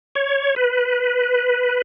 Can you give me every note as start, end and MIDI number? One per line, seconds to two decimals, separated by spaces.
0.15 0.55 73
0.56 1.82 71